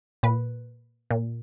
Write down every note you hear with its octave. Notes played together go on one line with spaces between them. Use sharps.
A#2 B4
A#2